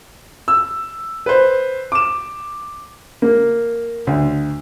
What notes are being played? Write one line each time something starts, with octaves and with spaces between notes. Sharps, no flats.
E6
B4 C5
D6 E7
A#3
D2